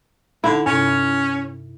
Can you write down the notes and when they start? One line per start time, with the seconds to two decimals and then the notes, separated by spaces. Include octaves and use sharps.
0.44 D3 D#4 E4
0.66 G2 C3 C#4